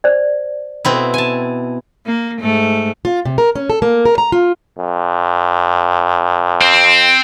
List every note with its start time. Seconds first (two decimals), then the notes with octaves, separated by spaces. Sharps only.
0.04 C5 D5
0.85 B2 C4 E4
1.14 G#5 A5
2.06 A#3
2.40 G#2 A3
3.05 F4
3.25 C3
3.38 A#4
3.55 C#4
3.70 A4
3.82 A#3
4.05 A#4
4.18 A#5
4.32 F4
4.79 F2
6.61 C4